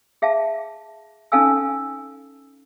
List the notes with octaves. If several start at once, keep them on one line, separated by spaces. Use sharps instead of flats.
G#4 E5 F5 A5
C#4 D#4 A4 F5 G#5 E6